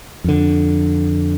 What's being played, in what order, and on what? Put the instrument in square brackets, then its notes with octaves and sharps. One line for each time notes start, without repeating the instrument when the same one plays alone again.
[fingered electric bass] F2 D3